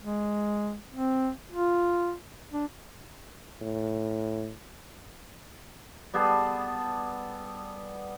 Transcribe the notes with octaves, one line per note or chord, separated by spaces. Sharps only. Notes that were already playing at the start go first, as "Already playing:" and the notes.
G#3
C4
F4
D4
A2
G3 B3 G#4 A4